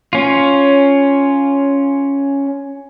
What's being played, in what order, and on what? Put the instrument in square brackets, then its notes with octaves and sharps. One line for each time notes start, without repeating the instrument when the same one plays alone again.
[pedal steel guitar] C#4 F4